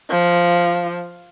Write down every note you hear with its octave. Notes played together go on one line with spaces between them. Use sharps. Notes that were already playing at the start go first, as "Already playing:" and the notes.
F3